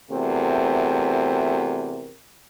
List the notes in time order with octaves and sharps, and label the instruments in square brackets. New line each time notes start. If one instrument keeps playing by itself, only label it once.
[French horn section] E2 C3 A3 C4 F#4 A#4